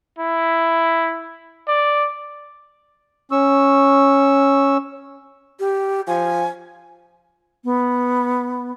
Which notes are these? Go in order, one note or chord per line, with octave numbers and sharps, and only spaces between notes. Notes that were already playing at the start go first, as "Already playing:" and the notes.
E4
D5
C#4 C#6 E6
G4
F3 G#5
B3